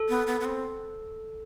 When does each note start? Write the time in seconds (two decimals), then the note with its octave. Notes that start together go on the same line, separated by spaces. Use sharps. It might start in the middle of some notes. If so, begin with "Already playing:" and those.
Already playing: A4
0.09 B3
0.27 B3
0.41 B3
0.45 C4